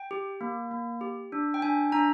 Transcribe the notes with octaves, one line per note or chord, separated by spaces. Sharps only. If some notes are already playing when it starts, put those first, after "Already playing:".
Already playing: G5
G4
A#3
A#3
G4
D4
G5
D4 G#5
D4 A#5